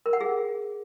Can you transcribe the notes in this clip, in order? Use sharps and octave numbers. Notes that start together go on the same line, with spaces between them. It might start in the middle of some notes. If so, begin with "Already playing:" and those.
A#4
F#5
G#4